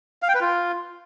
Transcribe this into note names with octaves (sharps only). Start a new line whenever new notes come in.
F5
G5
B4
F4